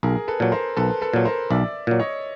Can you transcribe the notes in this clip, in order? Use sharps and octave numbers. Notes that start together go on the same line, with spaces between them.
B1 G#4 A#4
A4 B4
A#2 F#3
A#4 C5
B1 A4 B4
A4 B4
A#2 F#3
A#4 C5
B1 D5 E5
A#2 F#3
C#5 D#5